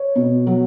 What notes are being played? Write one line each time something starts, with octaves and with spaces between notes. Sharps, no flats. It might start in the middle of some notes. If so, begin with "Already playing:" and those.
Already playing: C#5
B2
F#3